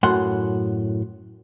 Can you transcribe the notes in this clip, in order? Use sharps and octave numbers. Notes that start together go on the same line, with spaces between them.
F#2 A2 F#5 C6